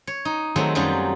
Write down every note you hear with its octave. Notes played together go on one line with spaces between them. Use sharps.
C#5
D#4
D#3 F#3 G#3 A3 C4
F#2 F#3 G3 D#4 F4